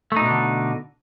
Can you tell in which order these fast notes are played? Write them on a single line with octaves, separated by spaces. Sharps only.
A3 D#4 B2 D4 D3